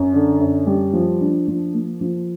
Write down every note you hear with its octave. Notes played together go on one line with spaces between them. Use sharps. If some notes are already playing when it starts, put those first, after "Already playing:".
Already playing: F#2
D3
F#2
G3
F3
D4
F3
A#3
F3